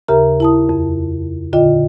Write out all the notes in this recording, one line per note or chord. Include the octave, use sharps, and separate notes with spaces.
D#2 C#3 G4 A#4 E5 A#5
E4 A5 D#6
F2
A#2 D3 F4 D#5 G5